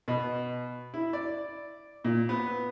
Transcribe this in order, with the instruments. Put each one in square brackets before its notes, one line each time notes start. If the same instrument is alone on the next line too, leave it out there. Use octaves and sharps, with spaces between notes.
[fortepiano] B2
E4
D5
A#2
B3